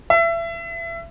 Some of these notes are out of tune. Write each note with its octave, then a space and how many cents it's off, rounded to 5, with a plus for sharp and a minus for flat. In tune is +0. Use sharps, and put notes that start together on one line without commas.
E5 +30